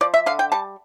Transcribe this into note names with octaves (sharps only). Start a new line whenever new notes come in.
F3 D5
E5
D3 F5
G5
G3 A5